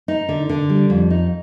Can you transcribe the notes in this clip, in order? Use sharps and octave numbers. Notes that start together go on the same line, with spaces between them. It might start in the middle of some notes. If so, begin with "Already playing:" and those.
D#4
D3
D3
G3
F2
D#4